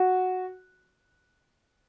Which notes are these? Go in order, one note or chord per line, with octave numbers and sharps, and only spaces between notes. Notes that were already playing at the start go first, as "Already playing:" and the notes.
Already playing: F#4